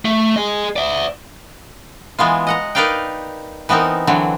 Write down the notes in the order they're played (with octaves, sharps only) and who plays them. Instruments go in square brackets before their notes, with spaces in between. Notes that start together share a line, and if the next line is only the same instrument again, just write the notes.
[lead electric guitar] A3
G#4 D#5
D5 E5
[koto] E3 G#3 B3 F4
D#5 F#5 A#5
D#4 A#4 B4 D5 F5 G5
E3 B3 C4 D#4 A#4
D3 E3 F#3 C4